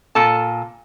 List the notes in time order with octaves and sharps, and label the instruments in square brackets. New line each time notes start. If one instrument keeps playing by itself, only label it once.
[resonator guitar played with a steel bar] A#2 A4 A5